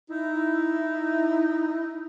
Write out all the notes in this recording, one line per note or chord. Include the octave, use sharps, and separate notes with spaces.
D#4 E4